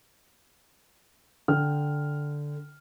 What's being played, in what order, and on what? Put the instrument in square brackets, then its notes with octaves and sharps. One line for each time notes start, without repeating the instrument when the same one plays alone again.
[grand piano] D3 G5 F6